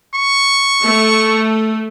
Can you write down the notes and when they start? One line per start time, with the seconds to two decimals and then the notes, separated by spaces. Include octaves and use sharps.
0.14 C#6
0.83 A3